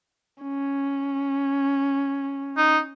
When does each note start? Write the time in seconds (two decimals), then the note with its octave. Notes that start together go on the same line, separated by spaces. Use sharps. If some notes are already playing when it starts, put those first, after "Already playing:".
0.43 C#4
2.57 D#4